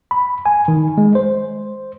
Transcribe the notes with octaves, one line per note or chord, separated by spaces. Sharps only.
B5
G#5
D#3
G#3
C5